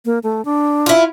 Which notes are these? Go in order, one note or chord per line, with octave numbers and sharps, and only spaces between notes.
A#3
A3
D4
E4 F4